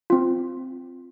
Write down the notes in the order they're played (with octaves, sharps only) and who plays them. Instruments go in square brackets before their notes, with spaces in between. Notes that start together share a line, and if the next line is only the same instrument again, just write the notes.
[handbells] C4 F4